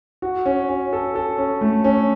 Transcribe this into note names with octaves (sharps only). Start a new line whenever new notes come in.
F#4
C#4
C#4
A4
A4
C#4
A3
C#4